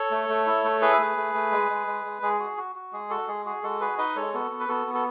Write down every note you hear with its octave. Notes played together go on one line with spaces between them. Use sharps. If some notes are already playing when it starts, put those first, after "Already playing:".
Already playing: A4 C#5
A3
A3
E4
A3
E4 G#4 B4
A3
A3
A3
G#3
G#3
G#3
G#3
G#3 G#4
F#4
F#4
F#4
G#3 G#4
F#4 A4
G#3 G#4
F#4 G#4
G#3 F#4 A4
F#4 G#4 B4
D#4 B4 D#5
G#3 A4 C#5
B3 F#4 A4
B3
B4
B3 F#4 A4
B3
A4